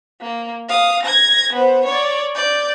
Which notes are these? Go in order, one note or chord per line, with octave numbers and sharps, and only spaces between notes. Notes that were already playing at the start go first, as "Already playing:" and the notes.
A#3
F5 D#6
G#6 A#6
B3 C5
C#5 D5
D5 G6